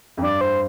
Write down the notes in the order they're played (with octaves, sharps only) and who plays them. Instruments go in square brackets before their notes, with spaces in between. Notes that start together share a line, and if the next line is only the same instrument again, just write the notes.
[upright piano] F2
[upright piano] G2 [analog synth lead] D5
[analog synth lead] C5